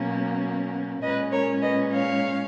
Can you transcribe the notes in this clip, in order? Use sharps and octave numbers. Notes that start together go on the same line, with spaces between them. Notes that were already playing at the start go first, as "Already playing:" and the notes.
Already playing: B2 F#3 A#3 C#4
A#2 G#3 C#4 B4 D#5
A#4 C#5
B4 D#5
C#5 F5